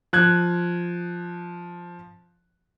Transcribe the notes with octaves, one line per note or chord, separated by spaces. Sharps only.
F3 F#6 G#6